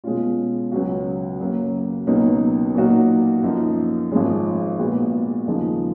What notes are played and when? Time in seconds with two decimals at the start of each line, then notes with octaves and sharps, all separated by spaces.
0.04 B2 G#3 C#4 F4
0.72 C#2 C#3 F#3 C#4 F#4
1.40 F#2 C#3 F#3 A#3
2.07 C#2 B2 F#3 A#3 D#4
2.75 A#2 F#3 A#3 D#4 F#4
3.43 F#2 F3 A#3 D#4
4.11 G#1 G#2 F3 G#3 C#4
4.79 A#2 G#3 B3 F#4
5.47 D#2 C#3 F3 G#3 D#4